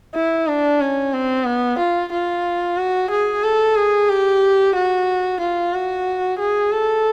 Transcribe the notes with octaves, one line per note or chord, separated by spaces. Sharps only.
E4
D4
C#4
C4
B3
F4
F4
F#4
G#4
A4
G#4
G4
F#4
F4
F#4
G#4
A4